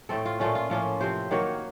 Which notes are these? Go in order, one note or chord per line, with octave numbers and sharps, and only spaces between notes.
A2 A3 C4 A4
F4
A#2 A3 C#4 F4
F4
A2 F3 A#3 C#4 F4
C3 F3 C4 C5
D#3 F#3 A#3 C#5